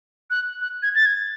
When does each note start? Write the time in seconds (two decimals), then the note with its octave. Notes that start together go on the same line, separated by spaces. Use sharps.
0.30 F#6
0.61 F#6
0.83 G#6
0.95 A6
1.06 G#6